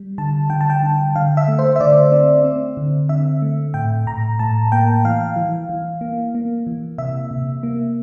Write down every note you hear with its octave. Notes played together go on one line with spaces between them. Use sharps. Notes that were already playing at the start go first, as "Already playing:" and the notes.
Already playing: G3
D3 A5
D3 G5
A5
G5
D3
D3 F5
E5
A3
C5
E5
D3 D5
C4
C4
D3
D3 E5
A3
A2 G5
A2 A#5
A2 A5
A#3 G5
E3 F5
E3
E3
A#3
A#3
E3
C3 E5
C3
A#3